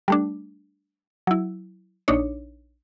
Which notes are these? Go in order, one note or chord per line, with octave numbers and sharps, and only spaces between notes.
G3 A3 D4
F#3 E4
A#1 D4 D#4 C#5